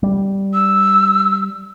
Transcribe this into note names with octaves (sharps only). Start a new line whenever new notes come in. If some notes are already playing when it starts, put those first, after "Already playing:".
G3
E6